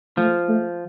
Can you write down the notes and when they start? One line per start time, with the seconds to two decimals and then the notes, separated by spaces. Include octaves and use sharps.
0.17 F3 A3
0.49 A3